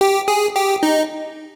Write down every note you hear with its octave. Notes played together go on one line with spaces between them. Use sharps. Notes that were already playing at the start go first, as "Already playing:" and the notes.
G4
G#4
G4
D#4